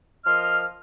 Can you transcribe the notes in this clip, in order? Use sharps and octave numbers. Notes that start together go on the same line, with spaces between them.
F3 A#4 D#5 C6 F6